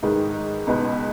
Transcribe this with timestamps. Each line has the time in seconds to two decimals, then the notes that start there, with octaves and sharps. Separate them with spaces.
0.03 G#2 D#3 G#3 D#4 B4
0.67 C#2 B2 B3 D#4 B4